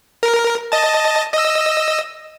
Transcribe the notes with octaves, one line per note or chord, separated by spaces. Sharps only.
A#4
D#5 A5
D#5 E6